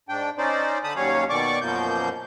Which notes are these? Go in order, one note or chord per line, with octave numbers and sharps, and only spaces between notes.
G#2 D4 G5
C#4 D#4 C5 D5
D3 A5 B5 D#6
D#2 F#3 G3 C#4 C#5 F5
B2 D#3 D5 C#6 D6
F#2 B2 F3 A#3 G6